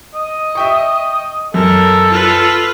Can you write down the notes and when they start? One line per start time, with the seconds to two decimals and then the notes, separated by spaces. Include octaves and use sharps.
0.14 D#5
0.55 E5 G5 C#6
1.54 F#2 A4 A#4
2.09 F4 B4